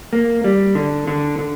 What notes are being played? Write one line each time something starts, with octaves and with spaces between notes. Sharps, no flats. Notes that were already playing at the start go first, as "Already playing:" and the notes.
A#3
G3
D3
D3
D3